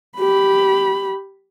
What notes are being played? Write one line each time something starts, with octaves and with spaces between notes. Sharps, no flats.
G4 B5